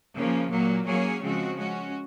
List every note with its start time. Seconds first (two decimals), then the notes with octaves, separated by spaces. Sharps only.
0.16 C#3 F3 A#3
0.51 A#2 F#3 A#3
0.86 F#3 A#3 C#4 G#4 C#5
1.22 C#3 F3 G#3 C4 F#4
1.57 G#3 C#4 F#4